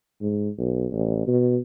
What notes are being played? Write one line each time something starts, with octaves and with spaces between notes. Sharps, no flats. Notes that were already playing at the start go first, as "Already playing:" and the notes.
G#2
B1
A1
B2